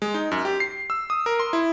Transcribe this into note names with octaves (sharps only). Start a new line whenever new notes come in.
G#3
D#4
F#2
G4
C7
E6
D#6
A#4
C6
E4